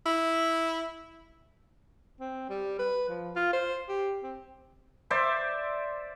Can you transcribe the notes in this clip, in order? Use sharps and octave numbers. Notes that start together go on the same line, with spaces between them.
E4
C4
G3
B4
F3
F4
C5
G4
C4
C5 D5 E5